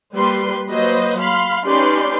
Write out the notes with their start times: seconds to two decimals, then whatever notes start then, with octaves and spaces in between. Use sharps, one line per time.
0.13 G3 A#3 B4 C6
0.68 F#3 A#3 B4 C5 D#5
1.20 F5 B5 C6
1.66 C#4 D#4 G4 B4 D5 C6